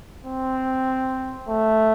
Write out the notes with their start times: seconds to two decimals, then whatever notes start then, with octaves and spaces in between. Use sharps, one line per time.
0.25 C4
1.48 A3